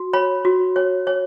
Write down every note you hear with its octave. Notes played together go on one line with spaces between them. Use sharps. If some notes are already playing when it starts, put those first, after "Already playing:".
Already playing: F#4
C#5 B5
F#4
C#5
C#5